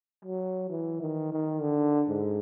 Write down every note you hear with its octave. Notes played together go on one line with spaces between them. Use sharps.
F#3
E3
D#3
D#3
D3
G#2